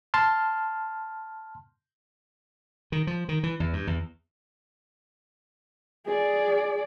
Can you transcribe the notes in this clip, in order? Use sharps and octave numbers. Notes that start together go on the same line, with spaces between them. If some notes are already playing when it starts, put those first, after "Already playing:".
A5 C6 F6
D#3
F3
D#3
E3
E2
G2
E2
G#4 D5